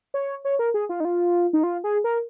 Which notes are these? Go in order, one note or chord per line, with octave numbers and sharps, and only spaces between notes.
C#5
C#5
A#4
G#4
F4
D#4
F4
D#4
F4
G#4
A#4